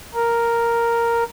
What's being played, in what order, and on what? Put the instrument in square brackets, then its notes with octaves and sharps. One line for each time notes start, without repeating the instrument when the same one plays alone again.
[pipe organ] A#4